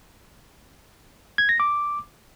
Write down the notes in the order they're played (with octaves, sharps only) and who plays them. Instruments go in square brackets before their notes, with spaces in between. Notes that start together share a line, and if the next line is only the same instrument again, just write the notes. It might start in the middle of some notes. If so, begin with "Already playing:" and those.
[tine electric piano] G#6
A#6
D6